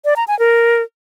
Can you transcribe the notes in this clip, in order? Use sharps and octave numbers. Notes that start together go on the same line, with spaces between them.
D5
A#5
G#5
A#4